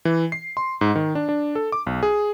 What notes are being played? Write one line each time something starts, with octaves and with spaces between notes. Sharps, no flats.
E3
C7
C6
G#2
D#3
D4
D4
A4
D6
B1
G#4